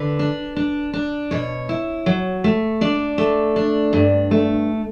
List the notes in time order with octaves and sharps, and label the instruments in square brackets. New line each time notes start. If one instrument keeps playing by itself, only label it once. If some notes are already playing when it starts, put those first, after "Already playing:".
Already playing: [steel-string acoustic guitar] D3 B4
D4
D4
D4
B2 C#5
E4
F#3
A3
D4 D5
A3
D4
G2
A3